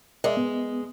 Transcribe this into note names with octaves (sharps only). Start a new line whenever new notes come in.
G#3 A#4 D5 E5
B3